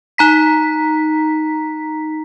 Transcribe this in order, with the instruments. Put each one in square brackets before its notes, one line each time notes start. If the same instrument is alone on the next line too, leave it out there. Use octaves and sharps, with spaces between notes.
[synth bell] D#4 A#5 B6